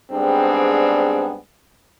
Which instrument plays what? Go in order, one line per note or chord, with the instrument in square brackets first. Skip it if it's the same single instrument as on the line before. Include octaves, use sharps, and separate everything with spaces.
[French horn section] G#2 G3 B3 C4 D4 G#4